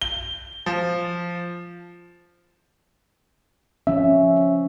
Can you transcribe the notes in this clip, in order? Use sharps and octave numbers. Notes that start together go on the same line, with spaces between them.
G7
F3
F3 C#4 E5